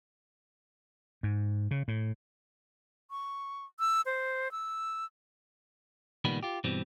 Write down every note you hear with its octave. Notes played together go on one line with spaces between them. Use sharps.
G#2
C#3
A2
C#6
E6
C5
E6
C#2 A#2 D#3 G3 B3 B5
F4 G4
G2 B2 E3 G3 C4